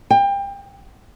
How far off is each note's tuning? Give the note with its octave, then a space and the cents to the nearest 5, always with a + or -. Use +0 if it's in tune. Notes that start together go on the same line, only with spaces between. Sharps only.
G5 +30